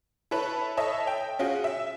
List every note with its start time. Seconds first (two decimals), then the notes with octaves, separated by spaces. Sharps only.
0.31 E4 A4 B4 C#5 B5
0.77 A4 C#5 D#5 E5
1.07 G5
1.39 C#4 F4 F#4 G#4
1.64 E5